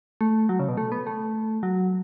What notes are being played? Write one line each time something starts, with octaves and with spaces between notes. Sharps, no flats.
A3
F#3
C#3
B2
A3
B3
A3
F#3